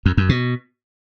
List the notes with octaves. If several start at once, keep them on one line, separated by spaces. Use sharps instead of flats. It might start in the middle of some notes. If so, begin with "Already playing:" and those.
F2
F#2
B2